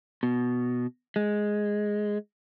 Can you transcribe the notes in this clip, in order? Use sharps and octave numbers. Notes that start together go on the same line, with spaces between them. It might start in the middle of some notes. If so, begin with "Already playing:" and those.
B2
G#3